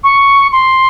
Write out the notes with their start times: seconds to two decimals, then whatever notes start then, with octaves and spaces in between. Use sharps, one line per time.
0.04 C#6
0.52 C6